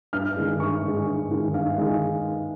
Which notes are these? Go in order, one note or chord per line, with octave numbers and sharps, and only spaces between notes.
G2 F6
D#3 G#3
G2 C#6
D#3 G#3
G2
D#3 G#3
G2 F5
D#3 G#3